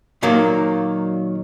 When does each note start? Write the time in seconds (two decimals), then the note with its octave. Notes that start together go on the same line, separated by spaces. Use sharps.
0.23 A#2 D#3 F#3 A#3